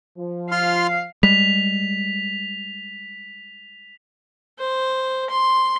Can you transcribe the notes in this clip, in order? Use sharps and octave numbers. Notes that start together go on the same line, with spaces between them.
F3
F4 F5 C6 F6
G3 G#3 B6 F7
C5
C6